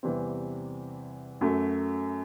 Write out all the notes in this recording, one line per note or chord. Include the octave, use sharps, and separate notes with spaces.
E2 C3 E3 G3 C4
F#2 F#3 A3